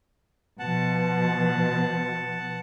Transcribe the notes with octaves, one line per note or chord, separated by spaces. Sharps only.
B2 F3 F#5 A5